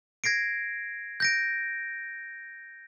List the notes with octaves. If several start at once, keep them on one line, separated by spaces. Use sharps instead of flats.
G#6 A#6 C7 D7
G6 A#6 D7